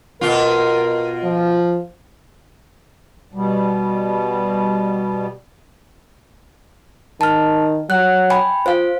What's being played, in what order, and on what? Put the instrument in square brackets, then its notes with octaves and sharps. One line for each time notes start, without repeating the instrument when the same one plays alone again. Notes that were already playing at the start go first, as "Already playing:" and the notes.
[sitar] B2 F4 [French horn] A#4
[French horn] F3
[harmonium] B2 G3
[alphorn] D#3 [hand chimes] A5 F6
[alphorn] F#3 [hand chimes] F#6
[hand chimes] G5 G#5 B5
[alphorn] F4 [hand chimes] C5 F5